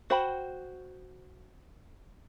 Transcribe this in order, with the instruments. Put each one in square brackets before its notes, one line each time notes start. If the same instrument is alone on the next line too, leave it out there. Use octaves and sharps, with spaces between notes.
[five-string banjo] F#4 C5 F#5 G5 B5